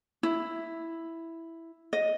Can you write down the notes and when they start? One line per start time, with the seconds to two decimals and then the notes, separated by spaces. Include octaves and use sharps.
0.23 E4
1.93 D#5